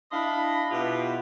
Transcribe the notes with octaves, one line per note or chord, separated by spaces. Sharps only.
D4 E4 D#5 F5 B5
B2 E4 F4 G4